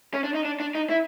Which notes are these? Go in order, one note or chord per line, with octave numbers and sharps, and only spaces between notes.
C#4
D4
D#4
D4
D4
D#4
E4